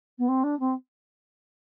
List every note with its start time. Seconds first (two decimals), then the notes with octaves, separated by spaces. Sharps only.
0.19 B3
0.28 C4
0.44 D4
0.60 C4